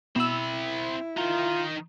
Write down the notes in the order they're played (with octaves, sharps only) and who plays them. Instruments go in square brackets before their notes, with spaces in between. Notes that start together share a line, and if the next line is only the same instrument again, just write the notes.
[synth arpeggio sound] B2 E6 [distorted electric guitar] C4 B5 [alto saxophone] E4
[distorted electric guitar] D#3 D#4 [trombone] F4